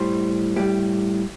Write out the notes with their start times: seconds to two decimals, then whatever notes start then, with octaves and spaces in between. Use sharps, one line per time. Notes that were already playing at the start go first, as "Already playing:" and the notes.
Already playing: A2 G3 C5
0.56 A2 G3 G4